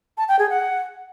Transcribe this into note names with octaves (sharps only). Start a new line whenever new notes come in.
A5
G5
G#4
F#5